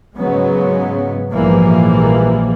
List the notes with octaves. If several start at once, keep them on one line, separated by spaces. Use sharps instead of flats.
G#2 C#3 F#3 G#3 B3
A#1 G#2 E3 F3 G3 A#3